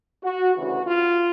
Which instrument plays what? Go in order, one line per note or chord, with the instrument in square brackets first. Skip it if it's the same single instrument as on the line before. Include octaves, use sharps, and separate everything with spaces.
[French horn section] F#4
D2 C#3 E3 F#4
F4